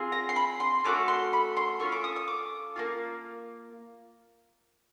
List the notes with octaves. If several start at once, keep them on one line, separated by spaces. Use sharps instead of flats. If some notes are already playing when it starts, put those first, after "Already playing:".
Already playing: C4 F4 G#4
A#5
C6
B5
C6
A3 C#4 F#4 A4 D6
C6
B5
C6
C#4 F4 A4 C#6
D6
D#6
D#6
D6
A#3 C#4 F4